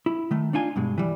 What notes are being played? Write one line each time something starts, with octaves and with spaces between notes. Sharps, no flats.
E4
D#3 A3
D4 D#4 F4 G#5
G2 B2 G#3
E3 G3